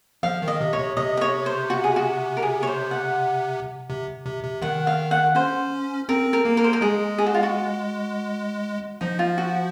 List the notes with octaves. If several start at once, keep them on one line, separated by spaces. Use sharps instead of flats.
F3 F5
D#3
D#5
C3
C3 C#5
C3 D#5
D#5
C#5
C5
F#4
G#4
F#4
A#4
G#4
C#5
C5
F#5
C3
C3
C3
D#3 F#5
F5
F#5
C#4 C5
C4 A#4
A#4
A#3
A#4
C5
A#4
G#3 G#4
G#4
F#4
F4
F#4
F3 D#4
F4
F#4